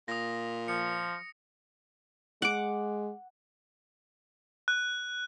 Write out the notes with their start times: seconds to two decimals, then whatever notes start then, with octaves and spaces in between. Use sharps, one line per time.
0.08 A#2 D#6 A#6
0.68 F3 C#7
2.42 G#3 F#5 D6
4.68 F#6